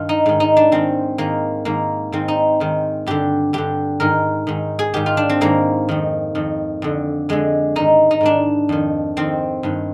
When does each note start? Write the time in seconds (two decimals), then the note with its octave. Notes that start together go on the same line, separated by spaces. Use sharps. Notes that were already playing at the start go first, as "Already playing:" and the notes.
Already playing: G2 D#3 F4
0.09 D#4
0.26 G#2 D#3
0.40 D#4
0.57 D4
0.72 G#2 D#3 C4
1.18 G#2 D#3 A#3
1.65 G#2 D#3 A#3
2.12 G#2 D#3 C4
2.28 D#4
2.60 G#2 D#3
3.06 G2 D3 G4
3.53 G2 D3 G4
4.00 G#2 D#3 A#4
4.47 G#2 D#3
4.79 G#4
4.94 G#2 D#3 G4
5.06 F4
5.17 D4
5.29 C4
5.41 G#2 D#3 A#3
5.89 F2 D#3
6.35 F2 D#3
6.82 F2 D3
7.29 F2 D3 G#3
7.76 G#2 D#3 D#4
8.11 D#4
8.21 G#2 D#3 D4
8.69 F2 D#3
9.17 F2 D#3 C4
9.63 G2 D#3